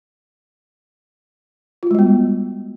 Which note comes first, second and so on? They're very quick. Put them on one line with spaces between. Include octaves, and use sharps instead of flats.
F4 F#4 G#3 G3 B3